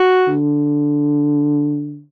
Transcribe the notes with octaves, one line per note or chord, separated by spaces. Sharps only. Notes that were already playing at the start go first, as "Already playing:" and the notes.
Already playing: F#4
D3